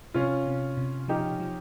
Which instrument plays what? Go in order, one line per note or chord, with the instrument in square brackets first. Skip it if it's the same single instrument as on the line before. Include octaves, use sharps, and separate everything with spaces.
[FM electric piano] C3 [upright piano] C#4 F4
[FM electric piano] C3
C3
[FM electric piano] F3 [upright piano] D#4 G4
[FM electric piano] F3